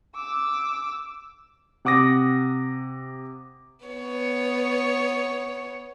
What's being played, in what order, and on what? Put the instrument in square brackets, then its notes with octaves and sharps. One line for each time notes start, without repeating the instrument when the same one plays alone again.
[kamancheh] D6 E6
[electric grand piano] C3 F#5 D6 D#6 A#6
[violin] B3 C#5